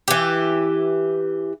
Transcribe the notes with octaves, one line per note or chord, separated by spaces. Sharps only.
E3 G4